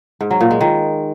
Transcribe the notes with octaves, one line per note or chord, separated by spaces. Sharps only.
G#2
F#3
A#2
G#3
D#3